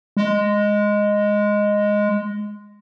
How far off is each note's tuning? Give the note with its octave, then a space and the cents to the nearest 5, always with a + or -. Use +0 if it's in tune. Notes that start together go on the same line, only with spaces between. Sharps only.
G#3 -5